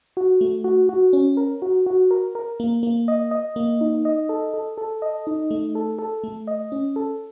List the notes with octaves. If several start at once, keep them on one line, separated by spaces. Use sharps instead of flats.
F#4
A3
F#4
F#4
C#4
A#4
F#4
F#4
A#4
A#4
A#3
A#3
D#5
D#5
A#3
D#4
D#5
A4
A4
A4
D#5
D#4
A3
A4
A4
A3
D#5
C#4
A4